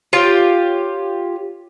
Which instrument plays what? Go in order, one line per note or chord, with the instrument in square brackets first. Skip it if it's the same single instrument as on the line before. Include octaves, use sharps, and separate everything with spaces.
[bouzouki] F4 G4 C#5